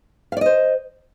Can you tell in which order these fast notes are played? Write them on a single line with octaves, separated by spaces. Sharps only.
F5 D5 D#5 C5